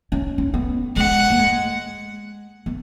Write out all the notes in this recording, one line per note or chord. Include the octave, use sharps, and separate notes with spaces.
C#4
C#4
B3
G#3 F#5
A#3
G#3
B3